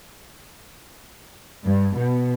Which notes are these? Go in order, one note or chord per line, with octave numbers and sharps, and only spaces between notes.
G2
B2